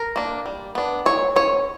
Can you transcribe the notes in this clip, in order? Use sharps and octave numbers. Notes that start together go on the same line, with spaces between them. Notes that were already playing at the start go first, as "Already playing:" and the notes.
Already playing: A#4
A#3 D4
G3
B3 D4
F#3 C#5
C#4 C#5